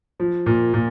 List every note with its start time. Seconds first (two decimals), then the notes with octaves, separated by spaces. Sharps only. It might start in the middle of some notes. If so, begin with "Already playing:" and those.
0.20 F3
0.46 A#2
0.74 A#2